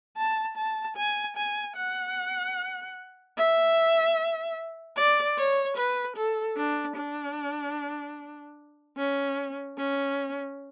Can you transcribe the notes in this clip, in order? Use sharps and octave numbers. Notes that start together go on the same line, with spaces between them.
A5
A5
G#5
G#5
F#5
E5
D5
C#5
B4
A4
D4
D4
C#4
C#4